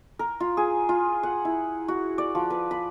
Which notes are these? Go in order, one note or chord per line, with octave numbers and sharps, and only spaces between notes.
A#4
F4
G#4
F4
F#5
E4
F#4
D5
F3
B4
B5